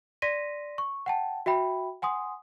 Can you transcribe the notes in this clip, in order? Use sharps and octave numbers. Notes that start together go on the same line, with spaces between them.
D5 C6 A#6 B6 D#7
C#6
F#5 G5 A5
F#4 E5 G5 B5
F#5 G#5 C6 D#6